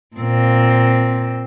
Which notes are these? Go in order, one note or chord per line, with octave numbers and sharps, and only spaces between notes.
A#2 C4